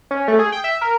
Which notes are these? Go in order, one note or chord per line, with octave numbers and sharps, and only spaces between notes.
C#4
A3
G#4
G5
E5
A#4